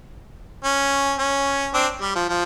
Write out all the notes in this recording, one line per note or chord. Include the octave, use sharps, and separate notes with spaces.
C#4
C#4
C4 D4
G3
F3
F3